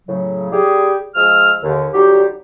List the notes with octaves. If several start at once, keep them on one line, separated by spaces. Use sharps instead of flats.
A2 C#3 F#3
G3 G4 G#4
F3 G#3 E6 F6
D#2 D3
D3 F#3 G3 D#4 G4